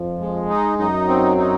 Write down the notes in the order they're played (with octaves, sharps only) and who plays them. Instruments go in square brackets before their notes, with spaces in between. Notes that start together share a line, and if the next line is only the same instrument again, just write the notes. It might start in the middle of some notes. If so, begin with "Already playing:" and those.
Already playing: [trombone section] F2 F3
[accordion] G#3
D#4
[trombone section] F#2 F#3 [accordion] D#4
[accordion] C4
D#4